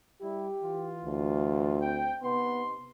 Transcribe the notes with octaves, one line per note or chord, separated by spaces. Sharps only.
G3 E4 G4
E3 F4
D2
C4 G5
C3 B3 D#4 C6